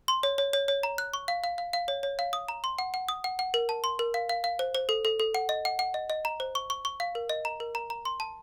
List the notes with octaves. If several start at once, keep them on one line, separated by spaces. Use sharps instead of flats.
C6
C#5
C#5
C#5
C#5
A#5
F#6
C#6
F5
F5
F5
F5
C#5
C#5
F5
D#6
A#5
C6
F#5
F#5
D#6
F#5
F#5
A#4
A5
C6
A#4
F5
F5
F5
C5
C5
A4
A4
A4
F#5
D#5
F#5
F#5
D#5
D#5
A#5
C5
C#6
C#6
C#6
F5
A#4
D#5
A#5
A#4
A#5
A#5
C6
A5